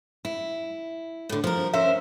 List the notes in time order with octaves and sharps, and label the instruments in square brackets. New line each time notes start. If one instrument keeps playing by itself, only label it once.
[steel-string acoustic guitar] E4
A2 D3
F3 A#4
[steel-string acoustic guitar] C#4 A#4 C5 [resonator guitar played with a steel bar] E5